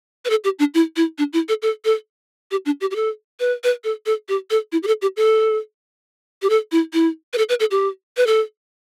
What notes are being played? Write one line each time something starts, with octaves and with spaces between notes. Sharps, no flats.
B4
A4
G4
D4
E4
E4
D4
E4
A4
A4
A4
G4
D4
G4
G4
A4
B4
B4
A4
A4
G4
A4
E4
G4
A4
G4
A4
G4
A4
E4
E4
B4
A4
B4
A4
G4
B4
A4